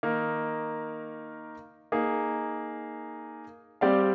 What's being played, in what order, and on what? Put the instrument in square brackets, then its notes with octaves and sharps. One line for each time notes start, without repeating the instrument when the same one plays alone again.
[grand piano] D#3 A#3 D#4 A#4
A#3 D#4 G#4
G3 C4 G4 D5 F5